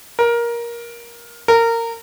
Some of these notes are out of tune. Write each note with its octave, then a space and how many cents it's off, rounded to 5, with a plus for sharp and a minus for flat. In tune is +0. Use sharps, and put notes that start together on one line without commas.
A#4 +15
A#4 -20